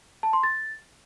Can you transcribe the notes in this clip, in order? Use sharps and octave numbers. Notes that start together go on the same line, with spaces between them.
A5
C6
A6